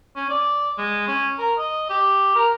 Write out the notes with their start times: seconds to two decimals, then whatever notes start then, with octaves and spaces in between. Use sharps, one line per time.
0.16 C#4
0.30 D5
0.78 G#3
1.08 C#4
1.39 A#4
1.58 D#5
1.90 G4
2.36 A#4